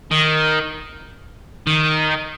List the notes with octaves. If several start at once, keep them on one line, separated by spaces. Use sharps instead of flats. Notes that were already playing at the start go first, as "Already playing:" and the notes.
D#3
D#3